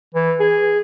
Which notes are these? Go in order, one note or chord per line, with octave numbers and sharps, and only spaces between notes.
E3
G#4